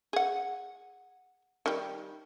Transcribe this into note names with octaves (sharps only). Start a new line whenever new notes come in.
G#4 F#5
D#3 G3